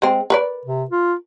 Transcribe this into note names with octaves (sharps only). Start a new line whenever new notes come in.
G#3 C4
A#4 B4 D5
C3
F4